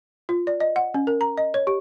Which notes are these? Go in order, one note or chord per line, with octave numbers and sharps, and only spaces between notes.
F4
D5
D#5
F#5
C#4
A#4
A#5
D#5
C#5
G4